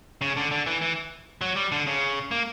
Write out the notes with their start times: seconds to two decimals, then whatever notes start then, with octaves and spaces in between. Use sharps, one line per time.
0.21 C#3
0.37 D3
0.51 D3
0.66 E3
0.82 E3
1.41 F#3
1.56 G3
1.72 D3
1.87 C#3
2.31 A#3